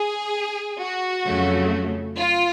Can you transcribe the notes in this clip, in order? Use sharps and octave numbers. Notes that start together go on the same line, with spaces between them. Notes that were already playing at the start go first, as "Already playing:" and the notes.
Already playing: G#4
F#4
F2 C#3 F#3 A3
F4